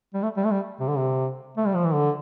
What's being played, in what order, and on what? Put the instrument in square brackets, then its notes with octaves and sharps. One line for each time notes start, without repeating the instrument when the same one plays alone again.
[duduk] G3
A3
G3
A3
G3
C3
D3
C3
A3
G3
F3
E3
D3